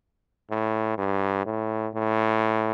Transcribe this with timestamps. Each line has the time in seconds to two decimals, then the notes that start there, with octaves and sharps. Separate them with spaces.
0.50 A2
0.97 G2
1.46 A2
1.95 A2